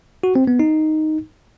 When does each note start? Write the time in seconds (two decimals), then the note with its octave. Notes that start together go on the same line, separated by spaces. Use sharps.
0.24 F#4
0.35 C4
0.47 B3
0.59 D#4